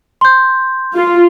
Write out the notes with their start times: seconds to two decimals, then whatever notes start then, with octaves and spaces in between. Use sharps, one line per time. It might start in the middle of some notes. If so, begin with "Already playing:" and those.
0.21 C6 G6
0.95 F4